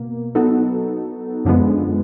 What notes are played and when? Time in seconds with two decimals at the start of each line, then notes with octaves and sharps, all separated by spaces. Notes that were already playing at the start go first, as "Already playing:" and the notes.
Already playing: B2 A#3
0.35 F#3 B3 D#4 F#4 A4
1.45 F#2 D3 F3 G#3 B3